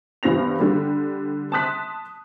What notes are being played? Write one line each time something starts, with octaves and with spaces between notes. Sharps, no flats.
E2 G2 C5 A#6 F7
D3 G3
A5 C6 D#6 F#6 B6